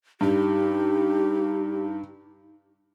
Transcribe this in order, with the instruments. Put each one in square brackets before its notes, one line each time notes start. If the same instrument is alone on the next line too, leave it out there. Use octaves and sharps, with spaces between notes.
[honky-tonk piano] G2 [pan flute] D#4 [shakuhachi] G4